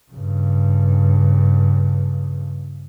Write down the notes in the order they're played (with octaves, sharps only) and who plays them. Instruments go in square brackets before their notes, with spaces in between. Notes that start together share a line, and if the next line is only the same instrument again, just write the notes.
[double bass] G2 C#3